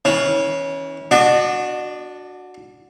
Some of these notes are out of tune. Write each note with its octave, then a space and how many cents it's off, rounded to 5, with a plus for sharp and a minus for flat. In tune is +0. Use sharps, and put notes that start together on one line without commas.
E3 -35 C#4 +0
D4 +0 F#4 -15 D#5 -40